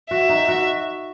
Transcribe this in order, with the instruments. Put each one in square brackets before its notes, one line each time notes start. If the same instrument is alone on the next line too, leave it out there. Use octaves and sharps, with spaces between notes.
[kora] F#4 [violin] E5
[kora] D#4
F#4